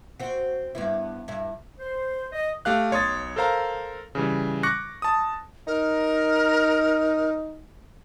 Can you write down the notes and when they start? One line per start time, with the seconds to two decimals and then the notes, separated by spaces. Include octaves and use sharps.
0.20 C4 F#4
0.75 G2 B3 E4
1.28 G2 E4
1.79 C5
2.32 D#5
2.65 A3 G4 F5 F#6
2.91 B1 C#5 C6 D#6 A6
3.36 A4 A#4 C5 F5 A#5
4.15 C#3 E3 G3
4.63 C#6 D6 F#6 A#6 C#7
5.02 A5 D#6
5.67 D#4 A#4